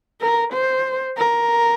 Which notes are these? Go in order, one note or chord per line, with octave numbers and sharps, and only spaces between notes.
A#4
C5
A#4